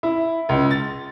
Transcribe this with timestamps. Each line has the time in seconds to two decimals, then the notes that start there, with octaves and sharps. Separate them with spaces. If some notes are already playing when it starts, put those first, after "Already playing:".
0.03 E4
0.49 C#2
0.71 A6